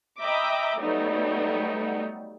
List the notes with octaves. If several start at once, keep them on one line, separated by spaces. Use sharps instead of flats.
D#5 E5 G5 A#5 B5 D6
F#3 G3 A3 B3 D#4